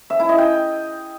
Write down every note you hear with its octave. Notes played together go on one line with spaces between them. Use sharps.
E5
E4
D#5
G5